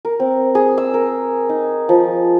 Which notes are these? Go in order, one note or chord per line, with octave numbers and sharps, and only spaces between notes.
A#4
C4
G#4
E6
A#4
D#4
F3